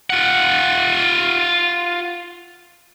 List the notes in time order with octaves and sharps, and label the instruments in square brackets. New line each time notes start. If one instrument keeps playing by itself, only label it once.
[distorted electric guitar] F4 F#5